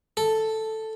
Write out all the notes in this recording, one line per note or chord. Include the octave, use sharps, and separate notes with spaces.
A4